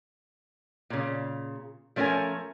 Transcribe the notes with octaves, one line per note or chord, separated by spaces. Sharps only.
A#2 C#3
F3 A3 C#4 G4 A#4 G#5